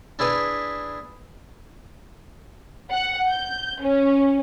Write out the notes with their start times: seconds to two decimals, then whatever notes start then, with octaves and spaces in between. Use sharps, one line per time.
0.19 D4 E4 G#4 B4
2.92 F#5
3.29 G6
3.82 C#4